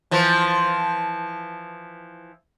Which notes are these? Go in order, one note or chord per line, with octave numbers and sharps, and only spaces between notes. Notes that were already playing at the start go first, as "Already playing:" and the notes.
E3 F3